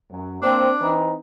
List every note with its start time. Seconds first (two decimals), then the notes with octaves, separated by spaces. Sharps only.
0.10 F#2
0.42 A#3 C4 D4
0.79 E3 C4 D#4